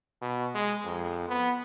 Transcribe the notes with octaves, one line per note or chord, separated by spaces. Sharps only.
B2
G#3
F2
B3